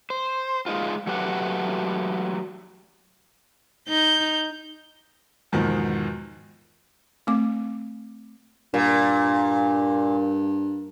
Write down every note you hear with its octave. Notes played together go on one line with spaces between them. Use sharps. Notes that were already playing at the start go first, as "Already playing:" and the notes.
C5
G#3 D#4 F4
F#3 A3 G4 B4 F#5
D#4 G6
E2 G#2 B2 D#3 F3
A3 C4 D6
G2 A#2